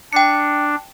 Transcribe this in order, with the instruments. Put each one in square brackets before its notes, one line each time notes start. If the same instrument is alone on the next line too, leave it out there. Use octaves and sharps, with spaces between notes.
[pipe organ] D4 [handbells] G5 C#7